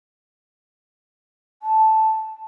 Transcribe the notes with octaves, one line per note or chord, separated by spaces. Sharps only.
A5